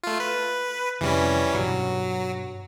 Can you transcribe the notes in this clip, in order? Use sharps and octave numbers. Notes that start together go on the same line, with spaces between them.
A3 F4
B4
F2 C3 E3 G3 C#4
G2 B2 F#3